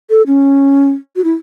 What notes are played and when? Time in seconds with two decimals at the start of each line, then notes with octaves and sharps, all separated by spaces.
0.10 A4
0.27 C#4
1.16 F#4
1.24 E4